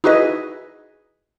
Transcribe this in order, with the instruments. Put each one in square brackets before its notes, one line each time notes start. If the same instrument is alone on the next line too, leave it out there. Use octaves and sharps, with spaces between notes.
[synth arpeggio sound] D#4 E4 F#4 G#4 B4 D#5